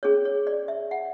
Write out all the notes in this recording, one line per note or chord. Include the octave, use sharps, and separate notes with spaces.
C#4 G#4 C#5
C#5
D5
E5
F#5